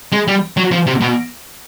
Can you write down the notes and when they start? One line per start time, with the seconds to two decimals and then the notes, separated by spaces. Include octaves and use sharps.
0.12 G#3
0.28 G3
0.57 F#3
0.72 F3
0.87 C3
1.01 B2